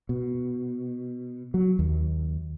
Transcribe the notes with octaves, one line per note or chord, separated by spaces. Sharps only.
B2
F#3
D#2